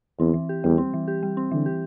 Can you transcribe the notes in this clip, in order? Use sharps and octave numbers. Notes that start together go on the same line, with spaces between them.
E2 C4
E3
G4
E2 G3
C4
E3
G4
G3
C4
D3 E3
G4